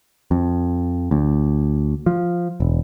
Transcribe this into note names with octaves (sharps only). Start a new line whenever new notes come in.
F2
D2
F3
E1